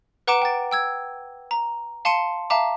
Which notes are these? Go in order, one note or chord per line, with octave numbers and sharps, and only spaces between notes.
B4 F#5 A#5 D6 D7 E7
G5 A6
G5 E6 G#6
A#5
F5 A5 C6 C#7 D#7
E5 F5 A5 A#5 D6